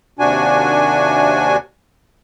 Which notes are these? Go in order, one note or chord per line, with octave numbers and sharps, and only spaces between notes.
D#2 C3 D4 F#4 G#5